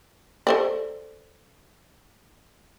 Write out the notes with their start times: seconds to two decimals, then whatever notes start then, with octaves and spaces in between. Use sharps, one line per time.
0.47 A4 C5 D5